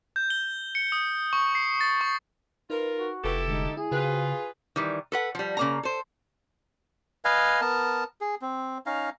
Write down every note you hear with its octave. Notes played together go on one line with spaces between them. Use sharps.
G6
G7
C#7
D#6
C#6
C7
A6
C#6
D#4 F4 A#4 B4
F#4
F1 E4 F4 G4 A4 B4
D3 G#3 D#4
E4 G#4
C#3 F4 F#4 B4 C5 G5
D#3 E3 G3
A4 B4 F#5
F3 G3
C#3 A#3 A#5
A4 C5
B4 D#5 F5 G#5
B3 A#4 A5
G#4
C4
C#4 D#4 F5 A#5